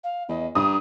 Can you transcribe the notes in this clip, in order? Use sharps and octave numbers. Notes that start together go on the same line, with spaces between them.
F5
E2 D#5
G2 A#5 D#6